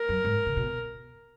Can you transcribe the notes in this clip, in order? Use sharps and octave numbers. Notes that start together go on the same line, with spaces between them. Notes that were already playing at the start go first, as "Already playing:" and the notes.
Already playing: A#4
F#2
G#2
C#3
B2